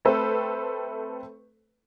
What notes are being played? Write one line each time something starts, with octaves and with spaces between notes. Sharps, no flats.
A3 C4 A4 B4 C5